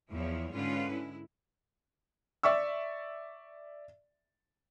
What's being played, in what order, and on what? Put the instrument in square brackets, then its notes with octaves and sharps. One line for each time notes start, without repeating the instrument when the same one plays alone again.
[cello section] E2 F3 E4 C#5
G#2 D3 G#3 C#4 F4 B4
G#3 E4
[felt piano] D5 E5 C#6 E6